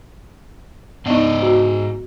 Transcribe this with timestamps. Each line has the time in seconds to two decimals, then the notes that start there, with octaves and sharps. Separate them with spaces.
1.06 G#2 B3 D4 D#4 D5 D#5
1.42 F#4